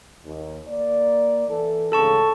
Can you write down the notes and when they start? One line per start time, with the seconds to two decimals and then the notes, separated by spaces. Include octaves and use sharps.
0.24 D#2
0.67 A#3 D5
1.48 E3 E4 A4
1.92 D2 G#2 C#3 A4 A5 C#6